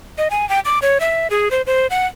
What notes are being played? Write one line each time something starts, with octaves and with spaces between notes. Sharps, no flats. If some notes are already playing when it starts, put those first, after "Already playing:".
D#5
G#5
G5
D6
C#5
E5
G#4
C5
C5
F#5